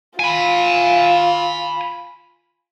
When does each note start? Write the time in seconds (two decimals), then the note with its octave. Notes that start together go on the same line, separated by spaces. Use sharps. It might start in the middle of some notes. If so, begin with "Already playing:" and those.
0.19 F4 G#5 B5